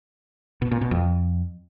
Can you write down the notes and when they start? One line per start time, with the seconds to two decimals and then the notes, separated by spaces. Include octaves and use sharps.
0.62 B2
0.72 A#2
0.81 B2
0.91 F2